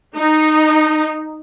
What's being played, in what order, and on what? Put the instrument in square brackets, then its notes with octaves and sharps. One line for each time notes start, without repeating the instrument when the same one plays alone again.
[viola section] D#4